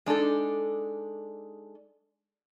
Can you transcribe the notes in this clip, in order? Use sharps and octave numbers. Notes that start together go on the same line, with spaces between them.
G#3 D4 D#4 A4